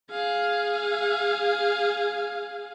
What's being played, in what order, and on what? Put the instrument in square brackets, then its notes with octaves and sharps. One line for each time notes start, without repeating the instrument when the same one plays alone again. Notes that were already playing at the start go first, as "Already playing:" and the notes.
[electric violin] G#4 F5